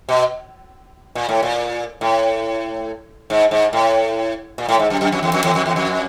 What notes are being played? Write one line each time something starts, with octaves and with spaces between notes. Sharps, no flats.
B2
A#2
A2
A#2
A2
G#2
G#2
A2
A#2
A2
G#2
F#2
F#2
F2
E2
F2
E2
F2
E2
F2